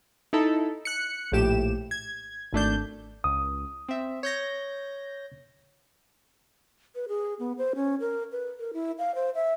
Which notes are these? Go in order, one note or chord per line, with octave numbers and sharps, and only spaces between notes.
D#4 E4 A4
F#6 C#7
A#1 A2 G4 E7
G#6
G#1 A3 D4 G6
C#2 D#6
C4 E5
C#5 G6 A#6
B4
G#4
B3
C5
C#4
A#4
B4
A#4
E4
F5
C5
E5